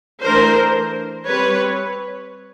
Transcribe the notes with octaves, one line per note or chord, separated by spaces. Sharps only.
E3 A3 D4 A#4 C5
G3 C4 B4 C#5